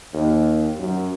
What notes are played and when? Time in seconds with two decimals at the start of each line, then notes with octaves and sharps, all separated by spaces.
0.14 D#2
0.79 F#2